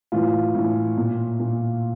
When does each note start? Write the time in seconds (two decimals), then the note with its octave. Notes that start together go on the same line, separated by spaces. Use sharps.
0.12 A2 E3 F4
0.54 A2 E3
0.97 A#2
1.39 A#2